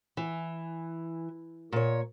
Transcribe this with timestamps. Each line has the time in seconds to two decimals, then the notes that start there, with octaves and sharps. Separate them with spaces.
0.17 E3
1.72 A#2 C#5